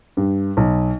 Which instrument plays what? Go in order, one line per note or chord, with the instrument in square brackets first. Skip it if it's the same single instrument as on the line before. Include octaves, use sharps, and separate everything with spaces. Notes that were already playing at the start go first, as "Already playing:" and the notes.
[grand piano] G2
B1